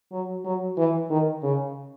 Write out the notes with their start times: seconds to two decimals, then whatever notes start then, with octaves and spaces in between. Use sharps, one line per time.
0.12 F#3
0.44 F#3
0.77 E3
1.10 D#3
1.43 C#3